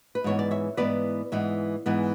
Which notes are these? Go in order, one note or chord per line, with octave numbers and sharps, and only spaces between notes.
B4
G#2 E3 B3 C#5
D5
C#5 E5
G#2 E3 B3 B4 D5
G#2 E3 B3
G#2 E3 B3